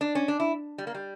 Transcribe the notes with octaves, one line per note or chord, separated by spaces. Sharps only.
D4
C#4
D4
E4
G3
A#3
G3